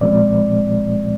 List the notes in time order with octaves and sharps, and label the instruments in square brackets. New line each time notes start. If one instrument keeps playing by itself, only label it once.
[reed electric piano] A#2 F3 G#3 C4 D5